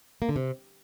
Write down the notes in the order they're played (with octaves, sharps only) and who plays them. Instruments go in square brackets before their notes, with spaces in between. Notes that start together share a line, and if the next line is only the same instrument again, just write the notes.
[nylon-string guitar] A#3
D3
C3